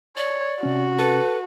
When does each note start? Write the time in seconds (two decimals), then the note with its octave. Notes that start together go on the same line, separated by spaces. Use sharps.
0.17 C#5 D5
0.63 C3 C#4 F#4
0.99 A4 B4